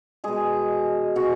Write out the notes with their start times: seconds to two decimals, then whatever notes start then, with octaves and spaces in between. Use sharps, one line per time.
0.24 B2 G#3 G#4
1.16 B2 G#3 F#4